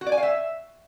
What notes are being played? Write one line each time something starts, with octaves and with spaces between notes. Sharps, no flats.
F#4
D5
G#5
F5
E5